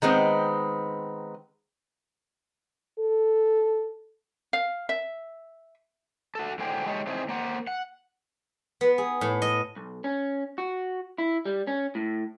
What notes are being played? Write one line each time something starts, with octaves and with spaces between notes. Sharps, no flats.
D#3 G#3 B3 C4
A4
F5
E5
F#4 A4
A2 D3 F#4 G#4 C5 G5
G#3 A3 D#4 G4 C#5
C4 D#4 E4 G#4 C5
A#3 C5 F#5
F#5
B3
G#4
A2
D#5
B1
C#4
F#4
E4
G3
C#4
A2